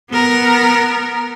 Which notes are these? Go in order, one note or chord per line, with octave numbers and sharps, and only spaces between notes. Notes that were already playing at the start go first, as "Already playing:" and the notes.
B3 A#4